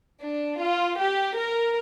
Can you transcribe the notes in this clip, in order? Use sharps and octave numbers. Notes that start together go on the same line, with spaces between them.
D4
F4
G4
A#4